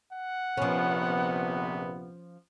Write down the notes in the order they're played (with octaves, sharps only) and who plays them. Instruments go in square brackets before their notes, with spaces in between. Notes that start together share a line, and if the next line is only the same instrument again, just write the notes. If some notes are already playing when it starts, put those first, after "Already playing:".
[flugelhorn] F#5
[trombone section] A#1 C3 B3 [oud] F3 C#4